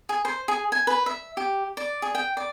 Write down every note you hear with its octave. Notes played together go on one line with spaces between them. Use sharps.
G#4
C5
G#4
G#5
B4
E5
G4
D5
G#4
G5
D5